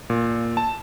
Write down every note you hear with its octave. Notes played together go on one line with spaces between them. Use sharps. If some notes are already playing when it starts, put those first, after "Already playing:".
A#2
A5